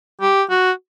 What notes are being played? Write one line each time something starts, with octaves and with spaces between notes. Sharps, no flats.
G4
F#4